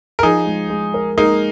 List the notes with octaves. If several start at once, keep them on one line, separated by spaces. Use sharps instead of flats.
A#4
F3 D#4 G#4
G#3
G#3
A#4
G#3 A#3 D#4